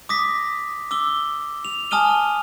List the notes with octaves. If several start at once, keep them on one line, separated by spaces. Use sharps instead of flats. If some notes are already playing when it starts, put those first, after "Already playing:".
D6 D#6 A#6 B6
D6 E6 G7
F7
G#5 A5 D#6 F6 D#7 G7